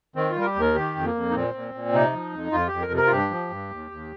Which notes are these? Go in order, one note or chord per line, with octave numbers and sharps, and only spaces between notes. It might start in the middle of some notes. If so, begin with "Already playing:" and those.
D#3 C4
F4
G3
A#4
G4
D#2 A#4
D#3 G4
F2
A#3
F2
D#4
A#2 C4
A#2
A#2
C3 D#4
F3
F2
F2 F4
F2 G4
A#4
C3
A#4
F4
G2 G4
F3
G2
D#2
D#2